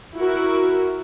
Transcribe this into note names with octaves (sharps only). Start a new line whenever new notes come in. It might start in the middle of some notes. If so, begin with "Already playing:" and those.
E4 F#4 A#4